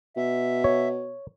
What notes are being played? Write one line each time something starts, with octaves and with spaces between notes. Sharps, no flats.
B2 E5
C#5